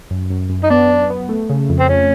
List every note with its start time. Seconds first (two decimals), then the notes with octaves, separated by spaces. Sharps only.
0.11 F#2
0.30 F#2
0.50 F#2
0.63 D#4
0.70 B3 D4
0.89 B3
1.10 B3
1.29 A3
1.50 C#3
1.69 F2
1.80 C4
1.89 F2 C#4